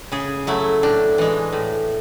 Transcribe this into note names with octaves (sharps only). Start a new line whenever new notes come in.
C#3 G#4
F#3 A3 E4
A2 D4
E3 G#3
A2